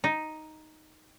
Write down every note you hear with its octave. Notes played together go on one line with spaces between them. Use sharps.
D#4